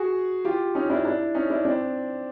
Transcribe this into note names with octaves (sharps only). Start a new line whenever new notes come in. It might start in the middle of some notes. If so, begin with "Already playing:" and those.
Already playing: F#4 G#4
F4 G4
C#4 D#4
D4 E4
D4 E4
C#4 D#4
D4 E4
C4 D4